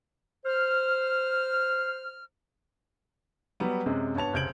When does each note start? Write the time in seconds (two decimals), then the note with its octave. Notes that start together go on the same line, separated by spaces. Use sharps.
0.46 C5 F6
3.60 F#3 G3 B3
3.86 F#2 C3 G#3
4.15 G2 B3 C#5 A5 F7
4.34 F1 C#2 G6 G#6 D7 F#7